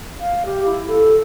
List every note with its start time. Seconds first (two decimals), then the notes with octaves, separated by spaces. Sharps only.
0.19 F5
0.45 G4
0.64 E4
0.87 A4